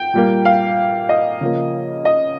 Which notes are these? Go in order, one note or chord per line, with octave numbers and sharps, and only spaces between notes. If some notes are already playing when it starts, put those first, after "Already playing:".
Already playing: G5
A#2 G3 A#3
F5
D#5
C#3 F3 A#3
D#5